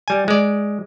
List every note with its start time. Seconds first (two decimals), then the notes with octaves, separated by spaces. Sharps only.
0.08 G3 G#5
0.28 G#3 D5